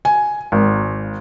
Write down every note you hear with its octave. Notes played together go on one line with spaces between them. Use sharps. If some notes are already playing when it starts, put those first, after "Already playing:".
G#5
G#1